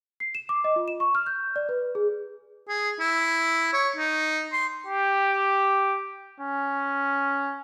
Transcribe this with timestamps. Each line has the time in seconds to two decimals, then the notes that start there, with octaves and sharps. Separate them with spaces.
0.20 C7
0.35 E7
0.49 D6
0.64 D#5
0.76 F4
0.88 E7
1.00 C#6
1.15 F6
1.26 G6
1.56 D5
1.69 B4
1.95 G#4
2.68 G#4
3.00 E4
3.73 C#5
3.96 D#4
4.53 C6
4.87 G4
6.40 C#4